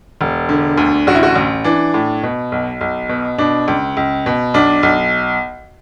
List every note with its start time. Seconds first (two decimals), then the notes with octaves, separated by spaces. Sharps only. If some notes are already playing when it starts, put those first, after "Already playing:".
0.21 E1
0.49 D3
0.78 D2
1.07 A1 F#4
1.15 E4
1.23 F#4
1.36 A1
1.64 E3 D4
1.94 A2
2.23 B2
2.52 B1
2.81 B1
3.09 B2
3.38 B2 D4
3.68 C#2
3.97 C#2
4.26 B2
4.54 B1 D4
4.83 B1